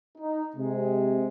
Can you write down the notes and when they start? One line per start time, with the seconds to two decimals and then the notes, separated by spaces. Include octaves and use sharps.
0.18 D#4
0.57 C3 G#3